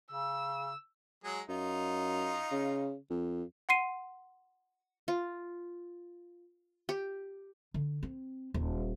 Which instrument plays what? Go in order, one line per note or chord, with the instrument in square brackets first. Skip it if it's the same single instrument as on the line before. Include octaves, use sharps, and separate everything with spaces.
[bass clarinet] C#3 [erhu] E6
[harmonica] F#3 G#3 G#4
[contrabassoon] F#2 [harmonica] D#4 F4
[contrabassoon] C#3
F2
[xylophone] F#5 C6 C7 D#7
[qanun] F4
G4
[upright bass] D3
C4
D#1